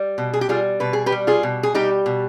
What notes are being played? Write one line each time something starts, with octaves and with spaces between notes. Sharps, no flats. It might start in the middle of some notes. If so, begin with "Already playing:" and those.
Already playing: G3
B2
G#4
G4
G3 F4 G#4
B2 B4
G#4
G4 B4
G3
F4 G#4
B2
G#4
G3 D#4 G4
B2